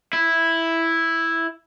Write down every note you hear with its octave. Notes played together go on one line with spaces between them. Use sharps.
E4